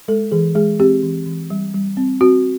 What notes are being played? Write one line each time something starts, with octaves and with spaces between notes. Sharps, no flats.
G#3 A4
E3 G#4
G#3 G#4
C4 G4
E3
E3
G3
G3
C4
C4 F#4